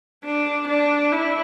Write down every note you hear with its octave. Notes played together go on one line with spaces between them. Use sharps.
D4
D4
E4